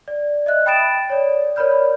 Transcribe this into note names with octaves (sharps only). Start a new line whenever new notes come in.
D5
D#5 E5 F#6
G5 B5 D#6 A6 D7 E7
C#5 D5
A#4 C#5 D5 B5 F6 G6